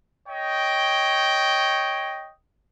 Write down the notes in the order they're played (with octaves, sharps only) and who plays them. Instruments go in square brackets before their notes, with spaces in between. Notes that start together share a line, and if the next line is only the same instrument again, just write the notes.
[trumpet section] C#5 D#5 G5